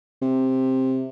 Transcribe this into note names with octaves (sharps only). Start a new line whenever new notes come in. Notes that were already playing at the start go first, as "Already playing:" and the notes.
C3